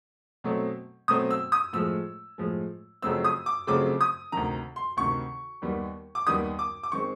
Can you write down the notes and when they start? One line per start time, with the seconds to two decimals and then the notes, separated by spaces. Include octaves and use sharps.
0.44 B2 F#3 A3 C4
1.08 B2 F#3 A3 C4 D#6
1.31 E6
1.52 D#6
1.73 A2 F3 G#3 E6
2.38 A2 F3 G#3
3.02 F2 C#3 F#3 A3 C4 E6
3.24 D#6
3.46 D6
3.67 F2 C#3 F#3 A3 C4 D6
4.01 D#6
4.32 D2 C3 D#3 A#5
4.76 C6
4.97 D2 C3 D#3 C#6
5.62 D#2 D#3 G3 B3
6.15 D6
6.26 D#2 D#3 G3 B3 D#6
6.59 D6
6.83 D6
6.92 D#3 G#3 C4 C#6